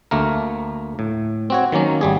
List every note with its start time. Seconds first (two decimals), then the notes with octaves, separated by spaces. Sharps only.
0.11 D2 A3 A#3 A#4
0.99 A2
1.50 C4 F#4 C#5
1.72 D#3 F#3 A#3 C#4
2.01 G#1 G3 G#4